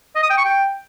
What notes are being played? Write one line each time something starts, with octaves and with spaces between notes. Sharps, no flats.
D#5
D#6
G5
C#6
G5